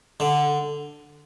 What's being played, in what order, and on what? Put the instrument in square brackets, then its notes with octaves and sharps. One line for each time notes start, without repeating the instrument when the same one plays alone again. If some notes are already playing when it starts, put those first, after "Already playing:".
[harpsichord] D3